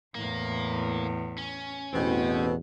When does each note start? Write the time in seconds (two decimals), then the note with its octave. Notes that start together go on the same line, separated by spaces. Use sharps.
0.15 E2 A2 A#3
1.38 C#4
1.93 A1 E2 B2 C4